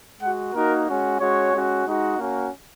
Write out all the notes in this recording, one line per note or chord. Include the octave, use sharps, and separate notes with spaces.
G#3 F#4 F#5
A#3 D#4 F#4 A#4
G#3 C#4 F#4
G#3 C#4 F#4 C#5
G#3 C#4 F#4
G#3 D#4 F#4
A#3 C#4 F#4